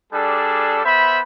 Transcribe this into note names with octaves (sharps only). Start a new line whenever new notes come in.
G3 D4 G#4 A4
B3 C5 E5 B5